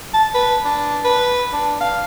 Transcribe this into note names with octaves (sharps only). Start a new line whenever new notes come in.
A5
B4
D4
B4
D4
F5